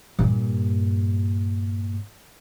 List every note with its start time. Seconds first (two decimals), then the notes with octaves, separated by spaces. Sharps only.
0.19 G2 A#2